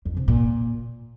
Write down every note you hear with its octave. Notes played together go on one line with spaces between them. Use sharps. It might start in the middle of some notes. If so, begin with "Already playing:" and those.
F2
C3
A#2